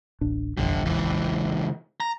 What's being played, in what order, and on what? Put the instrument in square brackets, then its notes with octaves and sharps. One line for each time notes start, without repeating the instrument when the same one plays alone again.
[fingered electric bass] D1 A1 D4
[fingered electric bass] F1 A#1 E2 [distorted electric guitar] G2 D3
[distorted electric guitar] C#2 E3
A#5